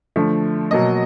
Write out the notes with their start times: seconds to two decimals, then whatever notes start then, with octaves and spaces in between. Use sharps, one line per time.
0.16 D3 F3 A3
0.71 B2 F#3 A#3 D#5